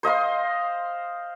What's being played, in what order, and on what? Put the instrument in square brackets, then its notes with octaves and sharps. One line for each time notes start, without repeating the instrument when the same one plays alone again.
[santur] C5 D#5 F5 C6